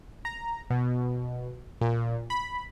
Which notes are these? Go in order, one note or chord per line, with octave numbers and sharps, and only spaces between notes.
A#5
B2
A#2
B5